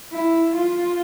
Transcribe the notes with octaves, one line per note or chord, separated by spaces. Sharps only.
E4
F4